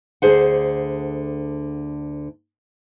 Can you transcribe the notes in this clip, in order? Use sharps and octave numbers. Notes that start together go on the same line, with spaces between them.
D2 B2 D3 G#4 C5 F#5